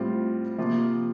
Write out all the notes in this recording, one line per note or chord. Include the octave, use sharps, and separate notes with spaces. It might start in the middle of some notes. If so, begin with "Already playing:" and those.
Already playing: A2 G3 C4 F4
C3 F3 A#3 F4